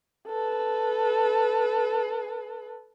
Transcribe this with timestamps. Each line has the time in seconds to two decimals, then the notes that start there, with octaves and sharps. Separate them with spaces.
0.27 A4 B4